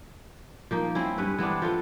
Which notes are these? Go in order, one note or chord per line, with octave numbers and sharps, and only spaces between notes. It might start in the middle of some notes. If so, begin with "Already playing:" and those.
F3 A#3 D#4
C4 C#4 E4
G2 C#4 B4
E3 B3 C4 D4
F3 F4 A4